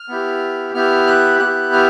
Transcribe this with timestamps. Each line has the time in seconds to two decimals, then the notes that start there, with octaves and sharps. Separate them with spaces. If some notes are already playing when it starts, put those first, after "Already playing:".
Already playing: F6
0.08 B3 E4 G4
0.74 B3 E4 G4 F6
1.07 F#6
1.40 B3 E4 G4 F#6
1.72 F6